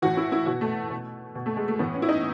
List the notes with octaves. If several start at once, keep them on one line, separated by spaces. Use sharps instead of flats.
A2 E3 F#4
E4
E4
B2 F#4
A3
B2
B2
A3
G#3
A3
A2 E3 B3
C#4
E4
D#4